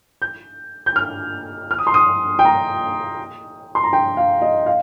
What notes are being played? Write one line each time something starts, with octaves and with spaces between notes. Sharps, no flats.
G6
G6
F6
F6
D#6
C6
D#6
G5
A#5
C6
A#5
G5
F5
D#5
F5